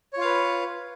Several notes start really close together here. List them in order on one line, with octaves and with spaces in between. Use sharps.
C#5 F4 F5 B4